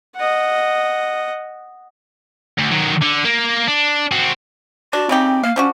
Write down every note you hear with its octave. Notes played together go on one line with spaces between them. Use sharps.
D#5 F#5
D2
D#3 F#3
D3
A#3
D4
C4 F#4
D4 F#4
C#3 C4 D#4 G4
A#3 F5
F3 C#4 D4 F#4